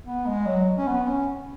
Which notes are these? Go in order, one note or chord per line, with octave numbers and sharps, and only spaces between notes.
B3
G#3
F#3
C#4
B3
C#4